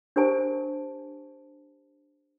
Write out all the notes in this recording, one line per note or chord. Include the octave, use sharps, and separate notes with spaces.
D4 G4 A#4 C5 G#5 A5